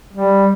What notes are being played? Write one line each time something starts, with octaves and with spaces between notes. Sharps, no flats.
G3